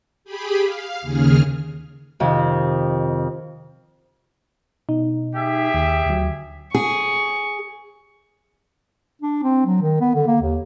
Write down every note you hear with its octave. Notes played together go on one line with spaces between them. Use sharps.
G4 G#4 B5
F5
D#2 C#3 G#4 F6
F2 C3 D#3
B2 D#4
G4 G#4 E5
D#2
D2 F#3
G#4 C#6
D4
C4
F#3
D#3
B3
D3
A#3
D#2